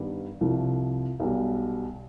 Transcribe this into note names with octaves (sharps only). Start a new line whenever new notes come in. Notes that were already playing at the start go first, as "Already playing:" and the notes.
Already playing: G2 D#3 G3 B3
C2 C3 F3
B1 B2 G3